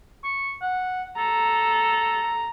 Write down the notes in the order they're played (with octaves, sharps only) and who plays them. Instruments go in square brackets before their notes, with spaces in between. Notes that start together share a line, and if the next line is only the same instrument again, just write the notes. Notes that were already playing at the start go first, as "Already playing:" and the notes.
[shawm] C#6
F#5
[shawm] A4 [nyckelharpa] A#5